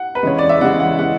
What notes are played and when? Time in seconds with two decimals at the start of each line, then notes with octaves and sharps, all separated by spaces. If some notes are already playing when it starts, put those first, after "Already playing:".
Already playing: F#5
0.15 B4
0.23 C#3 E3 G#3 C#5
0.39 D5
0.49 E5
0.61 C#3 E3 G#3 F#5
0.80 F#5
0.98 E3 G#3 F#5